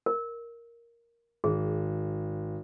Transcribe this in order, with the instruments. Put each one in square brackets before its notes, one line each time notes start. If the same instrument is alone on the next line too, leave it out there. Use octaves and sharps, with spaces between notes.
[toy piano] A#4
[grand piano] G#1 [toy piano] G#4